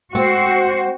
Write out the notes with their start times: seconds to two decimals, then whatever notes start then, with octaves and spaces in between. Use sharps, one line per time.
0.15 G#3 C4 F#4 C5